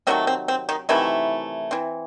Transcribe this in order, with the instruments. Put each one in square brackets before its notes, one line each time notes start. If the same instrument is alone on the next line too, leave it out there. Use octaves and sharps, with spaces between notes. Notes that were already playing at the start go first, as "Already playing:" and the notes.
[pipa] C3 D#3 F#3 A3 C4
C4
C4
D#3 D#4
C3 D#3 E3 F#3 A3 E4
E3 C4